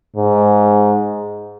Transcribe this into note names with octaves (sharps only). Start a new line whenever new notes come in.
G#2